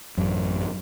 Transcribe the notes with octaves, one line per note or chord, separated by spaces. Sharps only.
A1 F#2